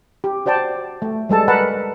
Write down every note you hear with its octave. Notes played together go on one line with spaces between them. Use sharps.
G4
F#4 C5 D5 G5 A5
A3
G3 G#3 A4 A5
A#4 B4 F#5 A5 B5